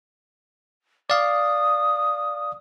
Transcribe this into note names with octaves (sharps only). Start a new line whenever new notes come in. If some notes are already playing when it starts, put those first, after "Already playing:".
D5 F5 D#6